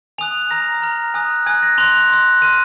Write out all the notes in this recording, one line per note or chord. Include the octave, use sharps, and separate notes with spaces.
G#5 D#6 F#6 F7
A#5 F6 A#6
A#5 F6
G#5 D#6 F#6
G#5 D#6 F#6 G#6
A#6
C6 F#6 F7
C6 F#6
C6 F6 D#7